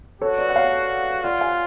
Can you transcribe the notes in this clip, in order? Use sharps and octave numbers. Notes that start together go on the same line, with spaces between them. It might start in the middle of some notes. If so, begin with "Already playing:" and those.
F#4 A4 C#5
B4 D5
F#5
C#5 F5
F4 D5 F#5
F5 G#5